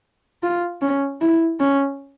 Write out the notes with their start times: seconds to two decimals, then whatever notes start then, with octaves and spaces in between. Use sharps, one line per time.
0.43 F4
0.81 C#4
1.21 E4
1.60 C#4